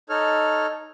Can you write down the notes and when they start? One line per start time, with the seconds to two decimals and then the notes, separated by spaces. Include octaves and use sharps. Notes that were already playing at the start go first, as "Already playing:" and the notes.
0.09 D#4 A4 C#5 F6